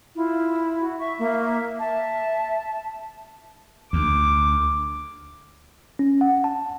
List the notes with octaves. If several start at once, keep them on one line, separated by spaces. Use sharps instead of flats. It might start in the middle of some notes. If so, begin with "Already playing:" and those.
E4 F4
F#4
E5 C#6
A#3
E5
E5 A5
D2 D6
C#4
F#5
A5